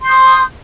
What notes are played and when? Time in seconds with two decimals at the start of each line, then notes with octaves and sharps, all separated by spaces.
0.01 C6
0.05 G6
0.10 D#6